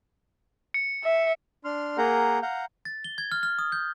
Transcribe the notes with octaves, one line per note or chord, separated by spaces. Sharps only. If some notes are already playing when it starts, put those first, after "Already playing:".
C#7
E5
D4 C6 F6
A#3 G#4 A#4 F#5 A#5 G6
F5 F#5 A#5 G6
A6
G7
G#6
F6
F6
D#6
G6